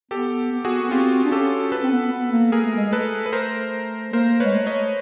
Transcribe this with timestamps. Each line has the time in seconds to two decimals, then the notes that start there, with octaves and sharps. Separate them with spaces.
0.11 B3 G4 A4
0.51 B3
0.65 F#4 G#4
0.82 B3
0.91 C4 F4 G4
1.24 D4
1.31 C#4 G4 A4
1.72 A4 B4
1.83 C4
1.91 B3
2.12 B3
2.32 A#3
2.52 A#3 G#4 A#4
2.65 A3
2.76 G#3
2.88 A3 A4 B4
3.26 B4
3.33 A#4 C5
4.13 A#3 A#4 C5
4.40 G#3 B4 C#5
4.54 A3
4.67 C#5 D#5